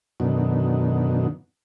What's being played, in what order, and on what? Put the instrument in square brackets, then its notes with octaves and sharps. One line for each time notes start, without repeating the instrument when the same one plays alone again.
[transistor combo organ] F#2 B2 D3 D#3